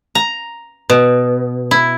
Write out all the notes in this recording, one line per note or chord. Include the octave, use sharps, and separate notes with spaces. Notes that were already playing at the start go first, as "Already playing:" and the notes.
A#5
B2
E4